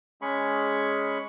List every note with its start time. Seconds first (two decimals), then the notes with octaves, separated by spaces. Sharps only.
0.22 G#3 C#4 G#4 B5 C#6